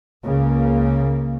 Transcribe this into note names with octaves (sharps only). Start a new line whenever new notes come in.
C#2 C#3 A#3